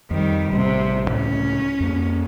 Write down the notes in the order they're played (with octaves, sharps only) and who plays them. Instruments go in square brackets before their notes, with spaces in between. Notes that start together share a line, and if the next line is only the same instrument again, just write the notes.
[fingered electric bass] F2 [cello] D#3 G3
[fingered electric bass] A1 G3 [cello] C3
[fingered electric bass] C#2 A2 [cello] C#4
[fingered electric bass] F2 A#3